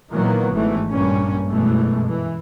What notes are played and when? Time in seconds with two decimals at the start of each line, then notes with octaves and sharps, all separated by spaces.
0.13 A#2 D#3 E3 F#3 A#3 B3
0.51 G#1 G#2 E3 A3
0.90 A#1 G2 G3 A#3 C#4
1.50 G1 F#2 B2 E3 G#3 A3
2.08 E3